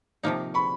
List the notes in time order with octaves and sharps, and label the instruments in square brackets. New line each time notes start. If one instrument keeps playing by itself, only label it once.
[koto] C3 F3 A#3 D#4
[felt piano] B5 C#6